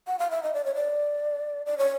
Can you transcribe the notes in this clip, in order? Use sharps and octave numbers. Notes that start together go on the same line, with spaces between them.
F#5
F5
E5
D#5
D5
C#5
D5
D5
C#5